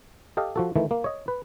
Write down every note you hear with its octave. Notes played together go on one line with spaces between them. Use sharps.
G4 A4 D#5 F5
F3 F#4 A4
D#3 E3 A3
A#3
C#5 D#5
B4